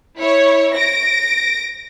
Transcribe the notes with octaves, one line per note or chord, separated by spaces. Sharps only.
E4 C#5
A#6 D7